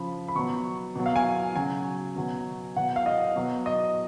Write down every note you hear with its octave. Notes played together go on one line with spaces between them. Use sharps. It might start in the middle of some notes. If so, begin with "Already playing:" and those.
Already playing: C#3 F3 B5
B5
B2 F#3 C#6
B2 F#3
F5
G#5
C#3 F#3 G#5
B2 F#3
B2 F#3 F#5
F5
D#5
B2 F#3
D#5